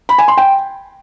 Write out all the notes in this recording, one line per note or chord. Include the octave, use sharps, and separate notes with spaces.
B5
G#5
C6
G5